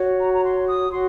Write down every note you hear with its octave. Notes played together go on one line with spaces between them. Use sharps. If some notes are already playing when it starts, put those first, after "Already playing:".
Already playing: F#4 C#5
A#5
A#5
C6
D#6
F#4 C6